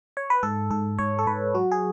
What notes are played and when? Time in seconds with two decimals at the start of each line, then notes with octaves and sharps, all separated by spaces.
0.17 C#5
0.30 B4
0.43 G#2 A4
0.71 G#2 A4
0.99 G#2 C#5
1.19 A4
1.27 G#2 B4
1.54 F#3 F#4
1.72 G#4